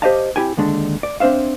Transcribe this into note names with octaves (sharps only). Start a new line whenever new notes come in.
G4 C5 D5 D#5 F5 A5
C4 E4 G4 G5 G#5
D#2 D3 G#3 D4
D5
C4 D4 C5 E5 F5